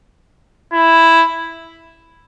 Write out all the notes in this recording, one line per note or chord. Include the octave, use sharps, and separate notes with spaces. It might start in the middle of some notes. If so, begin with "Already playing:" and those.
E4